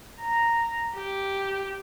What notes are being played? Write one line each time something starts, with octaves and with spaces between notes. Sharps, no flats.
A#5
G4